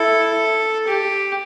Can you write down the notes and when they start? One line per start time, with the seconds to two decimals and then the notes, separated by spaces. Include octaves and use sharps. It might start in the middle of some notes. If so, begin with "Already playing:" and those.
Already playing: E4 A4
0.87 G4